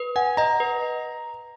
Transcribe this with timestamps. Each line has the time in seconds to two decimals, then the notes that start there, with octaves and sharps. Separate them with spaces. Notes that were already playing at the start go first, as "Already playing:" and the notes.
Already playing: B4
0.16 F#5 G#5
0.37 D#5 A#5
0.60 B4